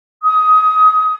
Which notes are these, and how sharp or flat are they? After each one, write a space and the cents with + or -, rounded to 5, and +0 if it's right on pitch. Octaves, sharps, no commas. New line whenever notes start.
D#6 +20